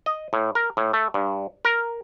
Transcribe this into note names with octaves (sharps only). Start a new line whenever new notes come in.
D#5
A2
A#4
A2
A3
G2
A#4